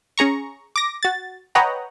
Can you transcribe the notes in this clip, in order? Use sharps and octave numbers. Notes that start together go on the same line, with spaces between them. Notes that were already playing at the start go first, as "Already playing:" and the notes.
C#4 G#4 A#5 C#6
D6 A#6
F#4 A6
B4 C#5 D#5 F#5 G5 A#5